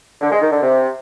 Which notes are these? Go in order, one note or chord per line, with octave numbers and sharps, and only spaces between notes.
D3
G#3
D#3
D3
C3